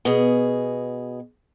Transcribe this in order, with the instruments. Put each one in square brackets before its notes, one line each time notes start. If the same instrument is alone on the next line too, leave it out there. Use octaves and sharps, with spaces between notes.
[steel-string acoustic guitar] B2 G#4